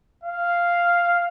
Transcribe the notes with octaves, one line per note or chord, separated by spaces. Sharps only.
F5